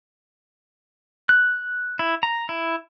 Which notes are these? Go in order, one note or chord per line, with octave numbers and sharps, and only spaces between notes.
F#6
E4
A#5
E4